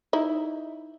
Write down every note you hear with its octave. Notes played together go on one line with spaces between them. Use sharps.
D#4 E4